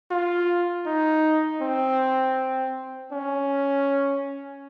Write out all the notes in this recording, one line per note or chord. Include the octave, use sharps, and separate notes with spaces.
F4
D#4
C4
C#4